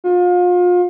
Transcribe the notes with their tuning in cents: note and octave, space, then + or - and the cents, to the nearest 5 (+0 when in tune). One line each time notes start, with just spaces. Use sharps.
F4 +35